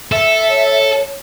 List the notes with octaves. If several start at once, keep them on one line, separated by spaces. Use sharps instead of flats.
A4 E5
C#5